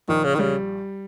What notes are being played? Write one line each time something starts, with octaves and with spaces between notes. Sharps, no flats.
A#1 D#3
C#3
D#3
C#3 G3